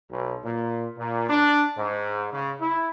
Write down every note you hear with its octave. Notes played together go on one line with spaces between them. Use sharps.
B1
A#2
A#2
D4
G#2
C#3
E4